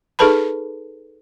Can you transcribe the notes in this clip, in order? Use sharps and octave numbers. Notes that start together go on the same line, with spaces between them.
D#4 G#4 A4 B4 A5 B5